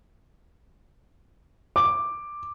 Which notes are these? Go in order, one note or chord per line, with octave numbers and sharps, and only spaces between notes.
D6